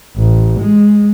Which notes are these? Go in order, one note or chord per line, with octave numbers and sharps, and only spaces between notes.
A1
G#3